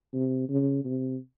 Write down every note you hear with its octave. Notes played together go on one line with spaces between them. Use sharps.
C3
C#3
C3